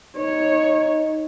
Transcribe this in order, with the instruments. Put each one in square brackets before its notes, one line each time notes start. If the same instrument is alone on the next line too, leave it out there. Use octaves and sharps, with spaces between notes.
[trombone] D#4 [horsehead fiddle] C#5